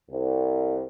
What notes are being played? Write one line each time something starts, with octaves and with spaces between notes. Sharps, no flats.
C2